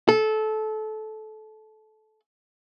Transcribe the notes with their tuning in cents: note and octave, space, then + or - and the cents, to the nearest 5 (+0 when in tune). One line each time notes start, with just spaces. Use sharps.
A4 -20